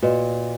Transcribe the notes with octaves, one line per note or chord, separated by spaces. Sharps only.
A#2 F#4 B4 D#5